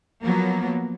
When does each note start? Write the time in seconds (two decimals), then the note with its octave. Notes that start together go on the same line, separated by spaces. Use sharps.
0.22 F3 F#3 A#3 B3